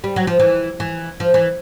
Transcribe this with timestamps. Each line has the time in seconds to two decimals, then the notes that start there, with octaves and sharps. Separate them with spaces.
0.04 G3
0.16 F#3
0.27 F3
0.40 E3
0.80 E3
1.20 F3
1.34 E3